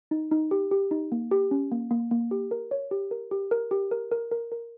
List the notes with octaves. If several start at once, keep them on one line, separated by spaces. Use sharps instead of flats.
D#4
D#4
G4
G4
D#4
A#3
G4
C#4
A#3
A#3
A#3
G4
A#4
C#5
G4
A#4
G4
A#4
G4
A#4
A#4
A#4
A#4